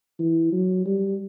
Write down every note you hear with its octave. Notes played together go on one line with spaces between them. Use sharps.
E3
F#3
G3